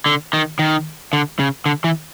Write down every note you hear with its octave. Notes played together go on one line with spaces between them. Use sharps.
D3
D#3
D#3
D3
C#3
D3
E3